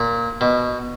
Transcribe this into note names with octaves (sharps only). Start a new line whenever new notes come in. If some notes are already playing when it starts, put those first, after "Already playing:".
Already playing: A#2
B2